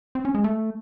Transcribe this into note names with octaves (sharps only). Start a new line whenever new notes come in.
C4
C#4
G#3
A3